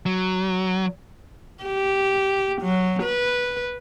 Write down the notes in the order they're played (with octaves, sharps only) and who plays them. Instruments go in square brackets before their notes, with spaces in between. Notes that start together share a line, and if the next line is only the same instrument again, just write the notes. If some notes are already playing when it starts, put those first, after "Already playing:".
[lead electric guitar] F#3
[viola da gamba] G4
F#3
B4